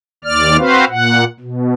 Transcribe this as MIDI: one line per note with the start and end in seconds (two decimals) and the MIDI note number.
0.25 0.57 39
0.25 0.57 74
0.25 0.57 89
0.58 0.85 60
0.58 0.85 66
0.58 0.85 71
0.58 0.85 72
0.58 0.85 77
0.90 1.24 46
0.90 1.24 78
1.40 1.74 47